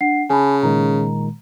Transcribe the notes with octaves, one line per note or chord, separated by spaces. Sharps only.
D4 F#5 C7
C#3 G#5 A5 B5
A#2 D#3 G#3 A#5